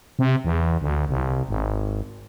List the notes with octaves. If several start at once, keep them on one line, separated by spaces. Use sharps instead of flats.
C3
E2
D2
C2
G#1